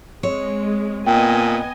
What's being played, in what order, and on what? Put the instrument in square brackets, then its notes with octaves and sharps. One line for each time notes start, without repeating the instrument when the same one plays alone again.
[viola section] G#3 [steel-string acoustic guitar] C4 C#5
[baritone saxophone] A#2 [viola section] B3 D#5 G#5 [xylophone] G5